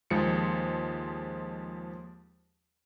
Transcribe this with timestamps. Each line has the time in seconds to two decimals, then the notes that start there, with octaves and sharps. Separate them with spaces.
0.10 D#2 F3 G#3 C#7